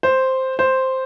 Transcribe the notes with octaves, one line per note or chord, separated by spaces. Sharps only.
C5
C5